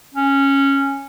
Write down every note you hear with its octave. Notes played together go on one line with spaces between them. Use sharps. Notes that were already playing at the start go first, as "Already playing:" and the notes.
C#4